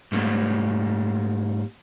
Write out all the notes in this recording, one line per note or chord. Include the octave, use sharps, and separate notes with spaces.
G#2 G3 A3 A#3